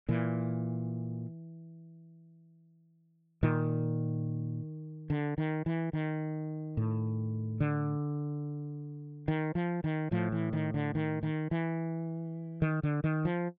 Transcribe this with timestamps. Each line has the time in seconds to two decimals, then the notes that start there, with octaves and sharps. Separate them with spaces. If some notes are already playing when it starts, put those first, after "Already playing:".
0.09 A#2 E3
3.43 A#2 D#3
5.10 D3
5.38 D#3
5.66 E3
5.93 D#3
6.77 A2
7.60 D3
9.28 D#3
9.55 F3
9.84 D#3
10.11 A2 F3
10.32 E3
10.53 D#3
10.74 D3
10.95 D#3
11.23 D#3
11.51 E3
12.62 D#3
12.83 D3
13.04 D#3
13.25 F3